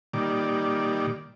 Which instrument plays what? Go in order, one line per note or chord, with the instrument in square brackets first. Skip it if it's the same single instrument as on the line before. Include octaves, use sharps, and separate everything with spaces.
[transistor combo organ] A#2 D#3 G3 D5